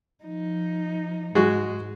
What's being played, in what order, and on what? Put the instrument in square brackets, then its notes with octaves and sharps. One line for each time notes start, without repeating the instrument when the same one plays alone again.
[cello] F3 D#4
[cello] G#2 [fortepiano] G#3 F#4